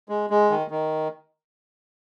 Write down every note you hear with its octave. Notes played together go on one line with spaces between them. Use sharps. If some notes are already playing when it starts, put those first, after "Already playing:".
G#3
G#3
D#3
D#3